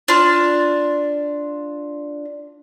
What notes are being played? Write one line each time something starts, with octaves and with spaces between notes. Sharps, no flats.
D4 F4